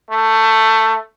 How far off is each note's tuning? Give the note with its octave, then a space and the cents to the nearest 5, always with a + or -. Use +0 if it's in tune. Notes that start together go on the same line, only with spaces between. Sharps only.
A3 +15